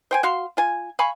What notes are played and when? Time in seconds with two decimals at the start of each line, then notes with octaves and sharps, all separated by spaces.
0.11 C5 G5 G#5
0.23 F#4 F5 C6
0.57 F4 G#5
0.99 F5 G#5 B5 C#6